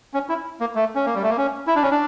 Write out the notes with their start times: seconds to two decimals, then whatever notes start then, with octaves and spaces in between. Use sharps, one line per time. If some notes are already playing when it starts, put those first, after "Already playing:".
0.14 C#4
0.29 E4
0.60 A#3
0.75 A3
0.95 C#4
1.06 A#3
1.15 G3
1.23 A3
1.30 A#3
1.38 C#4
1.67 E4
1.76 D4
1.82 C#4
1.91 D4